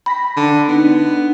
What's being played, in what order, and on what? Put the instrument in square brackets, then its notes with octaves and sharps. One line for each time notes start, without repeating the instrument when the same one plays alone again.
[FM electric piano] G5 A#6 B6 [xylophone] B5
[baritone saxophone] D3
[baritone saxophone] B3 [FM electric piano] D4 D#4